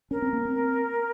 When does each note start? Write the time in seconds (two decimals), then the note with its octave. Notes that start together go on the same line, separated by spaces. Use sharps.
0.11 C#4 A#4
0.22 C4
0.33 A#3
0.45 C4